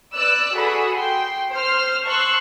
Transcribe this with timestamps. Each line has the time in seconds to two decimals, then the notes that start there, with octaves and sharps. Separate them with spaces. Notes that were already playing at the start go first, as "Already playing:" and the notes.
0.14 B4 D5 E6 F#6
0.53 F#4 G#4 A4 B5
0.97 G5 C6
1.51 C5 F6
2.07 A5 C6 C#6 E6 F#6